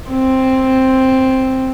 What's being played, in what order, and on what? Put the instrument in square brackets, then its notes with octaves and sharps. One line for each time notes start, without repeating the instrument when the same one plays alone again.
[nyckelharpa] C4